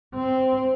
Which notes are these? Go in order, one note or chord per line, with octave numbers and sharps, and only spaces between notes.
C4